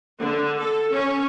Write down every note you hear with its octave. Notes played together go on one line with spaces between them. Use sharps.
D3
A4
C#4